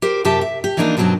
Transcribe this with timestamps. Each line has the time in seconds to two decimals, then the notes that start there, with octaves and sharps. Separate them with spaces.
0.02 G4 A#4 C5
0.25 F#2 C3 G4 E5 A5
0.41 E5
0.64 G4
0.77 E3 F3 A#3 D4 D#4 F4
0.97 G2 B2 F#3 C4 C#4 A5